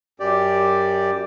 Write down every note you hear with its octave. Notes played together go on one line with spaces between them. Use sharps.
F#2 G4 D5